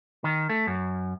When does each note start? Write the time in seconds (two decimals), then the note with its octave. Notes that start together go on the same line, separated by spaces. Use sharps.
0.24 D#3
0.49 A3
0.67 F#2